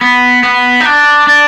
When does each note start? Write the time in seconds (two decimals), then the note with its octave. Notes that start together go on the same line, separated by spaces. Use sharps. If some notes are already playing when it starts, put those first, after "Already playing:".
0.01 B3
0.43 B3
0.80 D#4
0.85 D4
1.27 D4